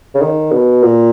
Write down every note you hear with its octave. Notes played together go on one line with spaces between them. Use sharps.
C#3
D#3
B2
A#2